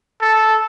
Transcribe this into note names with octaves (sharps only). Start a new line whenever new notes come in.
A4